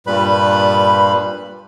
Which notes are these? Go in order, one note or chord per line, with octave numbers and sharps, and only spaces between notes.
G2 A#2 G3 B4 B5